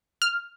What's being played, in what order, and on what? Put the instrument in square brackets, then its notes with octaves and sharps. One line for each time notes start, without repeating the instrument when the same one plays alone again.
[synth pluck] F6